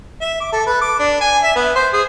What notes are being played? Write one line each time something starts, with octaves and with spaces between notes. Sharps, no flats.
E5
D6
A4
B4
D6
D4
G#5
E5
B3
C5
G#4